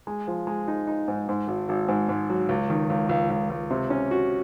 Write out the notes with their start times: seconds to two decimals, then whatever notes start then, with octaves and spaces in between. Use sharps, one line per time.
0.07 G#3
0.27 F3
0.47 G#3
0.68 D#4
0.87 D#4
1.08 G#2
1.29 G#2
1.48 G#1
1.69 G#1
1.88 G#2
2.09 G#2
2.30 F#3
2.49 C#2
2.70 D#3
2.90 C#2
3.09 C#2
3.30 C#2
3.50 C#2
3.71 C3
3.90 C#4
4.11 F#4